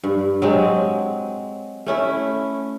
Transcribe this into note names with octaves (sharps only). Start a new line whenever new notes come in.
G2
F#3 G#3 C4
A3 C#4 E4